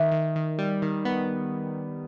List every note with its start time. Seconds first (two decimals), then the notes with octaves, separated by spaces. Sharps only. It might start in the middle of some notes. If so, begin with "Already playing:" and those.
Already playing: D#3 E5
0.12 D#3
0.36 D#3
0.58 G3
0.82 D#3
1.05 B3